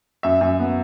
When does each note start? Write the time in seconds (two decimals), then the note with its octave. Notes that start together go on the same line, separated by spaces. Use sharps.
0.23 F#2 E5
0.41 F#2
0.59 B3